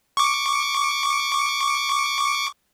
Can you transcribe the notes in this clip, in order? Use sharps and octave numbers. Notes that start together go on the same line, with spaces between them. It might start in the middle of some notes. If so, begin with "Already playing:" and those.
C#6 D6